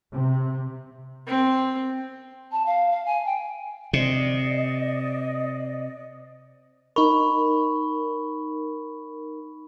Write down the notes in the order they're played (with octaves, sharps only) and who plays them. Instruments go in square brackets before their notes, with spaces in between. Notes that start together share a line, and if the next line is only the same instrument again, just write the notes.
[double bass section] C3
[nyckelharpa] C4
[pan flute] A5
F5
F5
G#5
G5
[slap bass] C3 [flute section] D5 D#5
[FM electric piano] D#4 A#4 [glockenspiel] B5 C#6